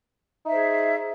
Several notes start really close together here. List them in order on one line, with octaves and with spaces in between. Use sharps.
D#4 E5 C5 G#4